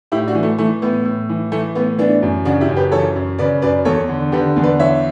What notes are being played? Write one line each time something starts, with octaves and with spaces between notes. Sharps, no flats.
A2 E4 G4
D4 F#4
E3
A3
E3 A3
A2 B3
A2
E3
E3 A3
A2 B3
E3 B3 D4
F#2
C#3 D4 F#4
E4 G4
F#2
G4 B4
E3 A4 C#5
F#2
C#3 B4 D5
F#2 B4 D5
E2 A4 C#5
D3
D3 G4 B4
E2
B4 D5
E3 C#5 E5